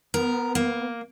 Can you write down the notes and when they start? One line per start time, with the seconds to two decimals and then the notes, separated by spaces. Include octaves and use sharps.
0.14 B3 A#4
0.55 A#3